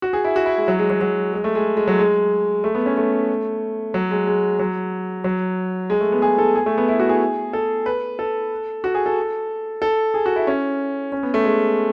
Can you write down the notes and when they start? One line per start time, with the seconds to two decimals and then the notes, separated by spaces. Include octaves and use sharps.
0.02 F#4
0.13 G#4
0.24 E4
0.36 F#4
0.46 E4
0.57 G#3
0.68 F#3
0.79 G#3
0.90 F#3
1.01 F#3
1.33 G#3
1.44 A3
1.55 G#3
1.77 G#3
1.87 F#3
1.99 G#3
2.64 A3
2.75 B3
2.86 C#4
2.97 A3
3.94 F#3
4.11 G#3
4.27 G#3
4.59 F#3
5.24 F#3
5.90 G#3
6.01 A3
6.12 B3
6.22 G#4
6.38 A4
6.55 G#4
6.66 A3
6.77 B3
6.88 E4
7.00 F#4
7.09 G#4
7.53 A4
7.86 B4
8.19 A4
8.84 F#4
8.95 G#4
9.06 A4
9.82 A4
10.14 G#4
10.26 F#4
10.36 E4
10.47 C#4
11.12 C#4
11.23 B3
11.34 A3
11.45 G#3